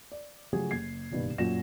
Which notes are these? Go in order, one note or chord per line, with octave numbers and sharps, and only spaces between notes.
D5
C#3 F3 F#3 A3 G4 G#4
F#1 G#6 C7
F#1 B1 G2 B2 D#3
F#2 A#2 F#3 F4 A#6 E7